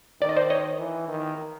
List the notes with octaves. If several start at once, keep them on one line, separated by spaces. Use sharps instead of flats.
D#3 D5
D#5
C5 D5
C#5 D#5
E3
D#3